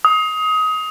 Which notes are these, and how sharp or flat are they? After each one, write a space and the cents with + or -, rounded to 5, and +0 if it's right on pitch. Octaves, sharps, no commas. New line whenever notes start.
D#6 +20